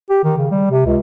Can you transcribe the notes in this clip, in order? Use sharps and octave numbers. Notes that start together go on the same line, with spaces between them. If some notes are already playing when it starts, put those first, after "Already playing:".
G4
D#3
C#3
G3
C3
C#2